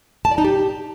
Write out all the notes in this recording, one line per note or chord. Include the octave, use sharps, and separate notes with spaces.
A5
D5
D#4
G4